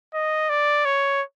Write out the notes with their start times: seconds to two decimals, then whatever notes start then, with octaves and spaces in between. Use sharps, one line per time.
0.14 D#5
0.50 D5
0.85 C#5